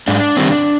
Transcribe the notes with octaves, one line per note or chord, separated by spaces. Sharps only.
G#2 D4
D#3 G3 C4